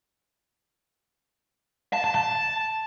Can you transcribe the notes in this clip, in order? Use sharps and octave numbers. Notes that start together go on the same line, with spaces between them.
A5
A5
A5